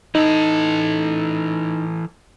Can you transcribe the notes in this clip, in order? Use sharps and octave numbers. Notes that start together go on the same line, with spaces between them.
E3 D#4 A4